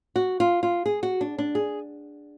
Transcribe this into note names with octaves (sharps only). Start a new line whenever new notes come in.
F#4
F4
F4
G#4
F#4
D4
D4
G#4